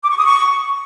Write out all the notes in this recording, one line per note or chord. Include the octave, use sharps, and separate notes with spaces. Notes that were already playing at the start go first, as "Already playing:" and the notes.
D6
C#6
D#6
C#6